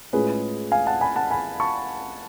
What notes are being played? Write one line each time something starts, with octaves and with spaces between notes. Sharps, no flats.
A2 G#3 C#4 F4 G#4 B4
F5 G#5
F#5 A5
G#5 B5
F#5 A5
G#5 B5
A5 C#6